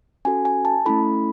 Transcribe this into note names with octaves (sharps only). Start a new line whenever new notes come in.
C#4 F#4 A4 G#5
G#5
A5
A3 C#4 E4 A4 B5